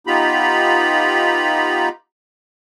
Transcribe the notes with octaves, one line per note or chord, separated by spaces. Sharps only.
B3 D#4 F4 G4 A#5 B5